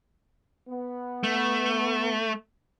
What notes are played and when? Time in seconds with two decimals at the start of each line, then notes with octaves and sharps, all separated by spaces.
0.68 B3
1.24 A3